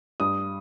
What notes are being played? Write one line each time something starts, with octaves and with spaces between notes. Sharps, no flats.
G2 D#6